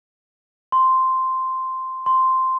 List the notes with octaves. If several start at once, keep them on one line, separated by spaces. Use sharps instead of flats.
C6
C6